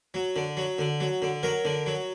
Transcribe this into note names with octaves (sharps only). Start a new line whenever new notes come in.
F#3
D3
F#3
D3
F#3
D3
F#3 A#4
D3
F#3